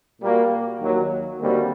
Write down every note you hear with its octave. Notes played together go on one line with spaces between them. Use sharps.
A#2 G3 A#3 F#4
D#2 D#3 F#3
D#2 D3 G3 C4 F#4